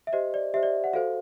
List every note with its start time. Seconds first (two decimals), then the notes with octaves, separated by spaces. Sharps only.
0.07 E5
0.13 G4 C5 D#5
0.34 D5
0.54 G4 C5 E5
0.63 D5
0.84 F#5
0.93 F#4 A4 C5 F5